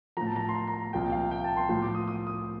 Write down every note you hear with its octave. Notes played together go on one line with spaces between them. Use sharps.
A2 F3 A#5
A5
A#5
C6
A#5
A#5
C2 A#2 F3 G5
F5
G5
A5
C6
A2 F3 C6
D6
D#6
D#6
D#6